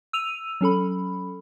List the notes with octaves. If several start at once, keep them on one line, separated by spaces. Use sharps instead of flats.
E6 D#7 F7
F#3 C#4 A4 B5